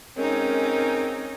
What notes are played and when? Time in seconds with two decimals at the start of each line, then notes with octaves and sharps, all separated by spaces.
0.17 G#2 G#3 C4 C#4 D#4 A#4